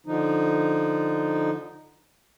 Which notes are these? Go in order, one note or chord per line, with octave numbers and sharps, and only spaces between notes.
D3 F3 D#4